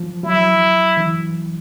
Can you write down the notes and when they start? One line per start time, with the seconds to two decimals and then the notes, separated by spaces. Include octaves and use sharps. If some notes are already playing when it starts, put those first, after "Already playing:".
Already playing: F3
0.23 F#3 E4
0.97 E3